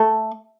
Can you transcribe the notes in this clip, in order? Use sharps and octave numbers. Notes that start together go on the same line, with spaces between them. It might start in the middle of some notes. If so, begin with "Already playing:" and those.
Already playing: A3